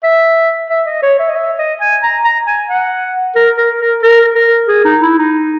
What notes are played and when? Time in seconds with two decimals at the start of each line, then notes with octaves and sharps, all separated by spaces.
0.04 E5
0.70 E5
0.86 D#5
1.02 C#5
1.19 E5
1.29 D#5
1.36 E5
1.59 D#5
1.81 G#5
2.03 A#5
2.25 A#5
2.47 G#5
2.69 F#5
3.35 A#4
3.58 A#4
3.79 A#4
4.02 A#4
4.35 A#4
4.68 G#4
4.85 D#4
5.01 E4
5.18 D#4